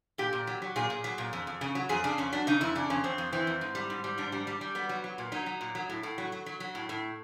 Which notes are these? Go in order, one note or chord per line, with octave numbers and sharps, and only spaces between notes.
A#2 G4
A#2
F#3
F#3
A#2 G#4
A#2
F#3
A#2
F2
F2
C#3
F#3
F2 G#4
C#3 D4
F2 C#4
F#3 D4
C#3 D#4
F2 E4
C#3 D4
F2 C#4
F2 C4
F2
E3 C4
F2
G#2
G3
G#2
G3
G#2 D4
G3
G3
G3
F#3 B3
F#3
F#3
A#2
F#3 D#4
F#3
A#2
F#3
A2
A2
F#3
F#3
F#3
F#3
A2
A2